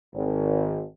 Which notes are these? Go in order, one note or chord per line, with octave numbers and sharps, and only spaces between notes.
G#1